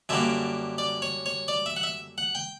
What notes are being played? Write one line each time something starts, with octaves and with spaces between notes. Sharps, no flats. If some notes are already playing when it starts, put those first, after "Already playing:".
F#2 D3 G3 A#3 E5
D5
C#5
C#5
D5
E5
F#5
E5
F#5
G5